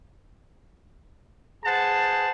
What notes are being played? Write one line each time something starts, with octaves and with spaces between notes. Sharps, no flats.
G#4 B4 C5 F#5 G#5 A5